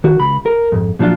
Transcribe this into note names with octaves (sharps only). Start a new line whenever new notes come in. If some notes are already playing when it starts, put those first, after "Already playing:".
D#3 F#4
C#2 B5
A#4
F2 G#2
A#2 F3 F#3 D4 F4